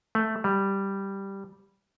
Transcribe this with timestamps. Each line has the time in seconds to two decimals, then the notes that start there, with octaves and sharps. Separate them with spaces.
0.15 A3
0.44 G3